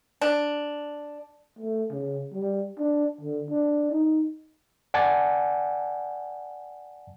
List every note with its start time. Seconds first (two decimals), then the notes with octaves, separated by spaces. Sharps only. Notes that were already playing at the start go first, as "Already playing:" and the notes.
0.21 D4
1.59 A3
1.91 C#3
2.34 G3
2.79 D4
3.21 D3
3.50 D4
3.92 D#4
4.94 D5 F#5 G#5 A5